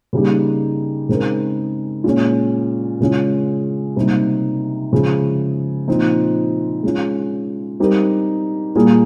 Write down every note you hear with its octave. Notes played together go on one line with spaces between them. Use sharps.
C#3 G3 A#3 D#4 G4
C#3 G#3 C4 D#4 A#4
A#2 G#3 C#4
C#3 G#3 C#4 F4
C3 G3 A#3 D#4
C#3 F3 G#3
A#2 F3 C4 D#4
G#3 C#4 F4
G3 C4 D#4 G4 A#4
A#2 G3 A#3 F4 G#4